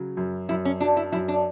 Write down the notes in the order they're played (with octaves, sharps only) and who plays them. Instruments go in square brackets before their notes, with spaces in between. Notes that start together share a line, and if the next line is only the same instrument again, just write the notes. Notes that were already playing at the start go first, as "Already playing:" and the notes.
Already playing: [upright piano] C#3 F#3
F#2
[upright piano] F#2 [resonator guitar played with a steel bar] E4
[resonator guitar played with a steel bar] C#4
[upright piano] F#3 [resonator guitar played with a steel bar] D4
[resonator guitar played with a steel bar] E4
[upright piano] F#2 [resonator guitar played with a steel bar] E4
[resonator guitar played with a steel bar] D4